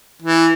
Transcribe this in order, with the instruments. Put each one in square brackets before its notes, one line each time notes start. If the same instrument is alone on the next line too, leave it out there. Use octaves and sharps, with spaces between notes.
[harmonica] E3